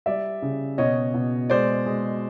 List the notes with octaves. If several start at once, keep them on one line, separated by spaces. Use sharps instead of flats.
G3 D5 E5
C#3
B2 C#5 D#5
B2
G#3 C5 D5
G#3